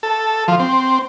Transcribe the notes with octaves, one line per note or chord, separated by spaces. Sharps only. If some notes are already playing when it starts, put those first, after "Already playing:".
A4
F3
C4